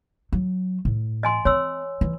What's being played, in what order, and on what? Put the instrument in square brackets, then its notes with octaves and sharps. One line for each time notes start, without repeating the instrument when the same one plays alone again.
[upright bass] F#3
A2
[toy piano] D#5 G#5 C6
[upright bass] C4 [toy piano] C#5 C6 E6
[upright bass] E3